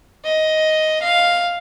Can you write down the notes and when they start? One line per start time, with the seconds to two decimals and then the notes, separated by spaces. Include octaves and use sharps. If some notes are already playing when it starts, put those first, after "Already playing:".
0.25 D#5
1.02 F5